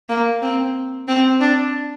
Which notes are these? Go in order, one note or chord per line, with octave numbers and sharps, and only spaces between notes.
A#3
C4
C4
D4